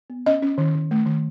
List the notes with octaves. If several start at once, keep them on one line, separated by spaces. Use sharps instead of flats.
B3
C#4 D#5
C#4
D#3
D#3
A3
D#3